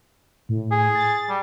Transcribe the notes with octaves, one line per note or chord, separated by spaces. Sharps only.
A2
G#4
A6
G3